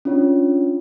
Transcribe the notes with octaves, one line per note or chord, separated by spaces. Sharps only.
C#4 D4 F4 C#5